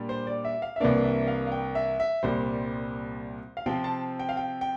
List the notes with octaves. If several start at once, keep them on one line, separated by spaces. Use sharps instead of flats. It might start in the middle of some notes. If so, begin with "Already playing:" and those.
Already playing: A#2 G3 D4
C5
D5
E5
F5
E5
C2 C3 E3 A#3 D4 D5
E5
F5
F5
G5
E5
E5
C2 A#2 G3 C5
F5
C3 F3 C4 G5
A5
G5
F5
G5
G5